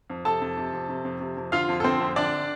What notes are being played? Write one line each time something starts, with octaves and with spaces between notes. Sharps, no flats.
F2
C3 A4 A5
F2
C3
F2
C3
F2
C3
F2
D3 F4 F5
F2
A4
D3 C4 C5
F2
D3 D4 D5